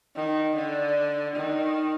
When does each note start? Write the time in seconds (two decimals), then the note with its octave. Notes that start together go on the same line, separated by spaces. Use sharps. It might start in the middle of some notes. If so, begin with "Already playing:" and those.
0.15 D#3
0.55 D3
1.35 D#3